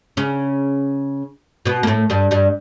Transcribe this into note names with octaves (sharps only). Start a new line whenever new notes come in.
C#3 C#4
B2 B3
A#3
A2 A3
G2 G3
G2 G3